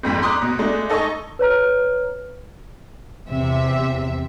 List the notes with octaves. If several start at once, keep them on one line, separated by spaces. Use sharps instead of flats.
G1 F2 G#2 B6
A#5 C6 D6 D#6 F#6
B2
G#3 A3 D4
D#4 A4 D#5 G#5 C#6
B4 C#5 A#5 F6
E2 C3 E5